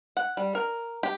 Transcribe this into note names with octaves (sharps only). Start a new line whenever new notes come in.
F#5
G3
A#4
G4